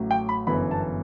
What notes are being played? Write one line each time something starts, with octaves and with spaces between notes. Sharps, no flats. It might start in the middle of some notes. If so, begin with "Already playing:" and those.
Already playing: A1 A2 F#3
G5
B5
G1 F#2 E3 B3 B5
A5